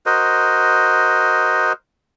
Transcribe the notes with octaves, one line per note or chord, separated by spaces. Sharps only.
F#4 A#4 C5 D#5